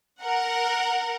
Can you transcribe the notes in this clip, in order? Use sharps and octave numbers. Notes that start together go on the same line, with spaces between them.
A#4 F#5